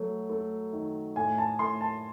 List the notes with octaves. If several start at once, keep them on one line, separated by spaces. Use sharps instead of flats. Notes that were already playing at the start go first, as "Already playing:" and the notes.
Already playing: F#3 A3
A3
D#3
A2 G#5
A5
A2 C6
A5